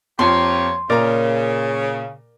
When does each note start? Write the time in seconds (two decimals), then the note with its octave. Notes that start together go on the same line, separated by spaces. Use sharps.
0.19 F2 F3 A#3 G4 C#5 A5 C6
0.90 A#2 C#3 A#4 D5 A#5